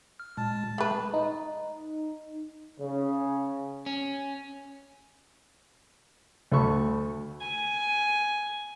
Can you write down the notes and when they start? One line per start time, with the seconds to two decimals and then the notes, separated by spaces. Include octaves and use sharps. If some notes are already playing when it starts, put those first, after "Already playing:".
0.20 F6
0.37 A#2 G#3 A5
0.78 G#3 A3 G#4 B4
1.14 D#4
2.79 C#3
3.86 C#4
6.52 D2 A4 B5 C#6
7.41 G#5